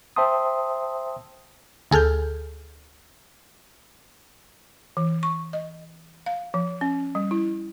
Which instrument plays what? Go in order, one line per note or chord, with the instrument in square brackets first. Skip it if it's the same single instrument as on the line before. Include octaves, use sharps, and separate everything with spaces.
[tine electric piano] C5 E5 G5 A5 C6 D#6
[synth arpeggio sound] D2 G#4 A4 F6 G6
[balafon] E3
C#6
D#5
F5
F3
C#4
G3
E4